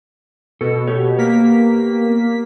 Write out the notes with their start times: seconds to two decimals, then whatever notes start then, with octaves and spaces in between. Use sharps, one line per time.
0.61 B2 A4
0.88 B3 G4 C#5
1.18 A#3 B6